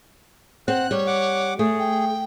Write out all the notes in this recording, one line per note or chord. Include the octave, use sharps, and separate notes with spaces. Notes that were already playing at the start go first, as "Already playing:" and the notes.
C4 F#5 F#6
G3 C#5
F#5 D6
A3 G#4
G5